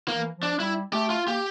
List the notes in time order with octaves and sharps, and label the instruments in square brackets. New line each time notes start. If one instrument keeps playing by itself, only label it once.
[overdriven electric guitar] A#3
[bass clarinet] E3
F3
[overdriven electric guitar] D4
[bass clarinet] G3 [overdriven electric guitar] E4
[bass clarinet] A3 [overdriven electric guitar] G4
[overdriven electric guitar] F4
[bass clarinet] A#3 [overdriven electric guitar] G4